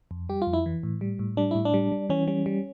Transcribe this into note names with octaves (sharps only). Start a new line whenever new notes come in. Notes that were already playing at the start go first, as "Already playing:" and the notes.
F2
G3 G4
F4
F2
E4
E3
A2
G3
A2
G3 D4
A2 E4
D4
G3
G3
E3 C#4
G3 C#4
G3